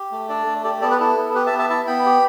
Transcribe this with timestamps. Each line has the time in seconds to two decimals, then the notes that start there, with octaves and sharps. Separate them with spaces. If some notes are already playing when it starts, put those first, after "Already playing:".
Already playing: G4
0.12 A3
0.29 D4 A4 D5
0.46 A3
0.64 G4 A4 D5
0.81 B3 A4 D5
0.91 B4
1.00 E4 A4
1.17 B3
1.30 A4
1.35 G4 B4
1.46 E5 A5
1.52 B3
1.59 E5 A5
1.69 E4 E5 A5
1.87 B3 G5 B5
2.05 G4